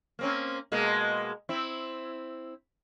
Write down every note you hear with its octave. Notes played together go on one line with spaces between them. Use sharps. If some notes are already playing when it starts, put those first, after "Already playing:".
A#3 C4 C#4
B2 G#3 A#3
C4 E4